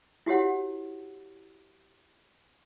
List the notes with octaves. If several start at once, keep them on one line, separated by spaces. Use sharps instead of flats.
E4 F#4 G4 C#5 F#5